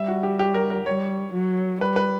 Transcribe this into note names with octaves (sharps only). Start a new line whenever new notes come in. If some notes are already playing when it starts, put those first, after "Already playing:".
Already playing: G3 E5
F#4
G4
G4
A#4
A#4
G3 C#5
F#3
G3 B4
B4